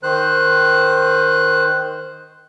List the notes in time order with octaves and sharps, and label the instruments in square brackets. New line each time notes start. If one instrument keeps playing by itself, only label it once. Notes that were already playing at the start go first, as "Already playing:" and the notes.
[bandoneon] D#3 C5 F#6